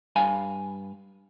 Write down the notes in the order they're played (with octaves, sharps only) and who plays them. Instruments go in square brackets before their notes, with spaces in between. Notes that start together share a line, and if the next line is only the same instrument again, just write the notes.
[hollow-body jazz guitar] G2 F5 G#5